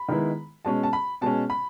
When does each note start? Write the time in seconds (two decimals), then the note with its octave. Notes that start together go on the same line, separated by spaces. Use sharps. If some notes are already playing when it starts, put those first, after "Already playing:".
Already playing: B5
0.08 D#3 G#3 B3 E4
0.65 B2 G#3 C#4 A5
0.83 A5
0.93 B5
1.21 B2 G#3 C#4 A5
1.50 B5